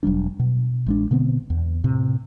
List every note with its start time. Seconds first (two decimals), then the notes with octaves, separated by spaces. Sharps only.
0.03 E1 F#3 G3 D4
0.39 B2
0.86 A1 G#3 D4
1.11 B2 D3 B3 C4
1.50 E2
1.84 A2 C3